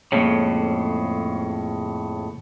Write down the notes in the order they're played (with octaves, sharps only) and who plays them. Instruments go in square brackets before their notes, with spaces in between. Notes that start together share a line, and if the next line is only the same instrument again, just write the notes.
[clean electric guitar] F2 A2 C#3 [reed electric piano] G#3 A#3 C#5